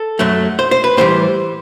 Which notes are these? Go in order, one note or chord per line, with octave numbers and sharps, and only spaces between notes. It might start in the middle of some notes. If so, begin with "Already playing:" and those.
Already playing: A4
F#2 F#3 A3
C5
C5
B4
A2 E3 G3 C5